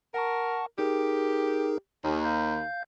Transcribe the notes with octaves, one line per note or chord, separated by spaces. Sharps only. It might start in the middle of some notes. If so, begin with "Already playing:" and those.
A#4 F#5 A5 C#6
D#4 G4 G#4 A#4
D#2
F5 G6